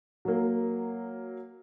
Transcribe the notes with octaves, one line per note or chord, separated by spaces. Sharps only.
F#3 A#3